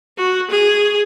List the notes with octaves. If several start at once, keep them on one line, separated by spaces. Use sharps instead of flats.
F#4
G#4